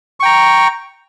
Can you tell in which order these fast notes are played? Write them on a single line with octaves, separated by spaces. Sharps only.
C#6 G5 A#5